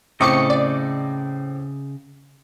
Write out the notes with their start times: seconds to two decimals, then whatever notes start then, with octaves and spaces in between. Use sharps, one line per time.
0.20 A2 C#3 C4 D#5 C#6 D6 C#7
0.50 D5